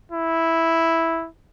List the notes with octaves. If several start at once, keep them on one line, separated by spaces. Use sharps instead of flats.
E4